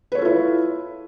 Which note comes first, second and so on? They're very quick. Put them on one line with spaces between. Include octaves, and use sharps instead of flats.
B4 C#5 A4 F4 E4